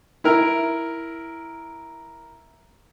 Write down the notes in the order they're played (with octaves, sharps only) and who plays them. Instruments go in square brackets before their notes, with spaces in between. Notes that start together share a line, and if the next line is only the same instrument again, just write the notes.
[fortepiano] E4 A#4